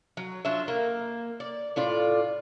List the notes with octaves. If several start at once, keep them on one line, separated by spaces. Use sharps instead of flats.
F#3
F#3 D4 F4 E5
A#3
D5
A2 F4 D5